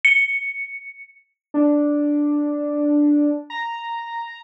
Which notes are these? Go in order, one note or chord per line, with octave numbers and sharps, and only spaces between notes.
C#7
D4
A#5